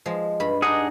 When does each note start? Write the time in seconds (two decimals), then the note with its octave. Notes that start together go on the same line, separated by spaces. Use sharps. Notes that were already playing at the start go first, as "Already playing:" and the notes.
0.06 F3 G#3
0.40 G2 B5
0.62 D4 D#4 G#4 D#5 F#5